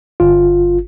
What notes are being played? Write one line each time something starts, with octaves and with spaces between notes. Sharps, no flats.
G1 F4